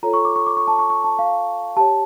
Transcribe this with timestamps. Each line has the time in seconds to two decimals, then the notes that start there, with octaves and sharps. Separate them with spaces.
0.03 F4 A4 C#5 A#5
0.14 C#6
0.25 D6
0.36 C#6
0.47 D6
0.57 C#6
0.67 A5
0.79 C#6
0.90 C#6
1.04 A5
1.19 F5
1.76 G4 C#5 A5